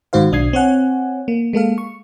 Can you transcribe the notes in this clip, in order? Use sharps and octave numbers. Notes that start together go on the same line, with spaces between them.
G#2 D#3 F#4 C5 F5
B1 D4 D#6 G#6 C7
C4 C#5 F#5 G#5
A#3
G#3 A#3 A4 F5
C#6